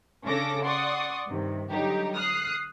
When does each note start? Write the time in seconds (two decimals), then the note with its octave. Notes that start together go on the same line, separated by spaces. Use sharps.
0.24 C#3 C#4 D4 A4 D6 A#6
0.63 D5 F#5 C6 C#6 D#6
1.26 G2 C3 D#3
1.70 D3 F#3 G3 D#4 G4
2.14 D#6 F6 F#6 C7